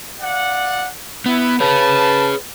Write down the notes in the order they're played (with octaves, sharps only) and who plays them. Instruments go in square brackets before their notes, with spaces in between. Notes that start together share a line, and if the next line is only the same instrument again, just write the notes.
[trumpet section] D5 F5 F#5
[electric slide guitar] B3 [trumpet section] E4
[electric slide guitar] G#4 C#5 [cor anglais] B4 [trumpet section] A5